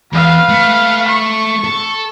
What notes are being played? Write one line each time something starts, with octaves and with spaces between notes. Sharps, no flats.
E2 B4 F5
A3
C#6
A4